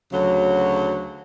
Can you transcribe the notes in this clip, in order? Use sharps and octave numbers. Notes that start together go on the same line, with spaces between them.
D2 C#3 F#3